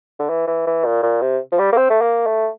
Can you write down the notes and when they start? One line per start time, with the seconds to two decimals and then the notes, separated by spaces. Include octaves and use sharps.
0.19 D3
0.30 E3
0.47 E3
0.67 E3
0.85 A#2
1.03 A#2
1.22 C3
1.52 F3
1.59 G3
1.72 A#3
1.77 C4
1.90 A3
2.01 A#3
2.26 A3